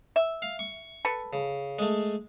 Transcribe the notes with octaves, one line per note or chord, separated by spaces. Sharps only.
E5
F5
C#6
A4 B4
C#3
G#3 A3